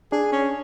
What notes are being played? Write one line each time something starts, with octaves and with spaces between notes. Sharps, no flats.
D4 G#4
C#4